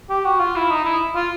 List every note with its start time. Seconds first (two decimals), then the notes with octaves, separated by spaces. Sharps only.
0.09 G4
0.25 F#4
0.40 F4
0.55 E4
0.71 D#4
0.85 E4
1.15 F4